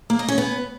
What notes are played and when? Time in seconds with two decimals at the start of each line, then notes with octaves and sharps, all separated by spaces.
0.10 A#3
0.19 D#5
0.28 C#4
0.38 B3